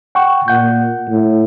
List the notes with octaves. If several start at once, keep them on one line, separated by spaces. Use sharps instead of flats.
F#5 G5 C#6
A#2 F#5 G6
A2